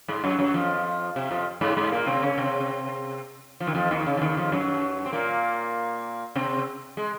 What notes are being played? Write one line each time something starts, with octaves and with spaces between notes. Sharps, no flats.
G#2 G#3
F#2 F#3
F#2 F#3
F2 F3
C3
F2 F3
G#2 G#3
G#2 G#3
A#2 A#3
C3 C4
C#3 C#4
C3 C4
F3
D#3
F2 F3
D#2 D#3
C#3
F3
D#2 D#3
F2 F3
F#2 F#3
C4
A#2 A#3
C3 C4
G#3